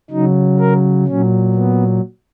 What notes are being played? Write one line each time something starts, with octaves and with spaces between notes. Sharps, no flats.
C#3 F#3 D#4
A#4
A#2 F#3 C#4
B3